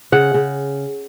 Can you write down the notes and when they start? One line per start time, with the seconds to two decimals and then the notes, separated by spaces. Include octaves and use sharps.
0.12 C#3 F#5
0.34 C#3